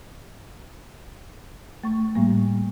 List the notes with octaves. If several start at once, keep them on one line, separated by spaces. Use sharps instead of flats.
A3 C#6
A2 G3 A#3